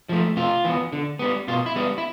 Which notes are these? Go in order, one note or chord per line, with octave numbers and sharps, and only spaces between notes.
F3 A3
C3 F4
E3 B3
D3
G3 B3
B2 F4
E4
G3 B3
E4